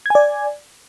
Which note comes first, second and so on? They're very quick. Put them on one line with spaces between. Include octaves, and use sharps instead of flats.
G#6 G#5 D5